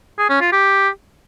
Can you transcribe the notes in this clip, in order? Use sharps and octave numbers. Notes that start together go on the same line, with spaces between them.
G#4
C#4
F4
G4